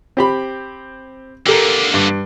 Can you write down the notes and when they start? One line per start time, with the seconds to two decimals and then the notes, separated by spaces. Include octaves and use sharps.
0.17 C4 G4 B5
1.46 D3 A#3 G4 A4 A#4
1.94 G2